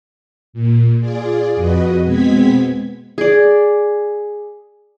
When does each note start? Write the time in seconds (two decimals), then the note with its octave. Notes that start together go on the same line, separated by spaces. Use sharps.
0.53 A#2
1.00 F4 G#4 D5
1.55 F2 F#4 B4 D#5
2.04 B2 G#3 B3 C4 G#6 B6
3.18 G#4 D5